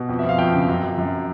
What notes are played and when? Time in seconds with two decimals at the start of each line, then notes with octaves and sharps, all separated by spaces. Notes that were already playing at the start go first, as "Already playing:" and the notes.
Already playing: B2
0.09 F2
0.19 E5
0.24 F3
0.29 F5
0.38 F2 G5
0.54 C#3
0.68 F#2
0.83 F#2
0.98 F#2